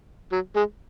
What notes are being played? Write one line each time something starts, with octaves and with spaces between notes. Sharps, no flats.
F#3
G#3